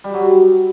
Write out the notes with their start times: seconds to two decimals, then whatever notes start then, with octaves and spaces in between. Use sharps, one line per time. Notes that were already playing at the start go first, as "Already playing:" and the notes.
0.04 G3
0.14 F#3